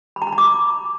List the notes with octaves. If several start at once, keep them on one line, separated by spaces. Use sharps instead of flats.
B5
A#5
B5
A#5
D6